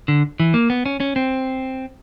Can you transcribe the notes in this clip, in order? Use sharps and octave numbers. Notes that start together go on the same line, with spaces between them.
D3
E3
A#3
B3
C#4
C#4
C4